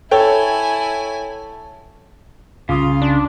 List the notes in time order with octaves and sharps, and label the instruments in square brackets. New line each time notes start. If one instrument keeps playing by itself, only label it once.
[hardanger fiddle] E4 G#5 [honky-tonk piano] A4 C#5 G5
[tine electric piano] C2 D6 D#6 [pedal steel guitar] C#3 [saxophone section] F4
[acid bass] D4